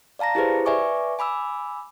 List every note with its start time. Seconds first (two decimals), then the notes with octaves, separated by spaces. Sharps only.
0.19 D5 F5 A5 A#5 A#6
0.35 E4 G4 G#4 B4 C5
0.66 B4 D5 E5 G#5 C#6 D6
1.19 G#5 B5 D6 E6